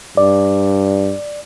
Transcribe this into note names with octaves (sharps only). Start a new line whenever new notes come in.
G2 D5